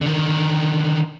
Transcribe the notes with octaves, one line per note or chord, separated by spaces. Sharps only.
D3 D#3